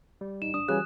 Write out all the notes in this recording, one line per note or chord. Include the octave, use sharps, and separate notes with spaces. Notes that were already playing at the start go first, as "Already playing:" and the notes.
G3
G#1 D#4 E7
A1 D4 D#6
C#3 E3 G3 F#4 G4 G#5 F#6